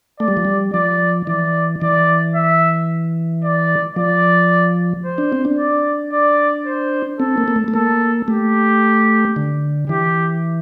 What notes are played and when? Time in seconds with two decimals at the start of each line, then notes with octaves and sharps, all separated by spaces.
0.20 A3 D5
0.28 G3
0.37 F3
0.45 G3
0.74 F3 D5
1.27 E3 D5
1.82 E3 D5
2.35 E5
3.44 D5
3.96 F3 D5
5.05 C5
5.18 D4
5.32 C4
5.45 D4
5.58 D5
6.12 D5
6.66 C5
7.20 C4 A4
7.38 A#3
7.48 A#3
7.56 A3
7.68 A3
7.74 A#3 A4
8.28 A3 G4
9.36 D3
9.89 E3 G4